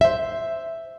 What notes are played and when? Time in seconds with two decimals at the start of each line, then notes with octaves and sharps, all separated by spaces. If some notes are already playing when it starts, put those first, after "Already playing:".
0.01 C5 E5